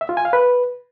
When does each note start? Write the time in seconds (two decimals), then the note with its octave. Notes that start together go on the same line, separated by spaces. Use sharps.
0.01 E5
0.09 F4
0.17 G#5
0.25 F5
0.33 B4